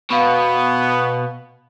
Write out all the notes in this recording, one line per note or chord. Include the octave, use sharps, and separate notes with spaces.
B2 B3 F5 B5